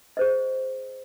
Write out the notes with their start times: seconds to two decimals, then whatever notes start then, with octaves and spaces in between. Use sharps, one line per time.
0.17 G#4 C5 D#5